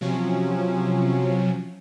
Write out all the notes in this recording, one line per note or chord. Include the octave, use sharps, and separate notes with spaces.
C3 F3 F#3 C#4